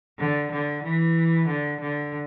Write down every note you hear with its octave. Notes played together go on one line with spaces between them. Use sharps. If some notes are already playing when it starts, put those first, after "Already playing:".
D3
D3
E3
D3
D3